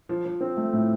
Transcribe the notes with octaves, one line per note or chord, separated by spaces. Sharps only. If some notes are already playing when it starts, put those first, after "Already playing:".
F3
F3
C4
A3
A2